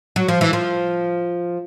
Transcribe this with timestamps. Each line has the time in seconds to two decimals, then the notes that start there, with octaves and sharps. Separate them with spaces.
0.16 F#3
0.28 F3
0.41 E3
0.53 F3